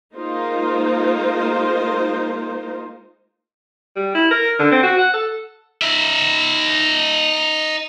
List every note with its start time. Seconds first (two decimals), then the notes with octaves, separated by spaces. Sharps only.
0.14 G#3 A#3 D#4 F4 A#4 C5
3.96 G3
4.15 E4
4.31 A#4
4.59 D3
4.71 C4
4.83 F#4
4.99 F#5
5.14 A4
5.82 D#4 E5